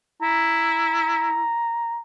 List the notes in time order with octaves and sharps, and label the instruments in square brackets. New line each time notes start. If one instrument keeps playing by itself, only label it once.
[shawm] E4 [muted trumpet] A#5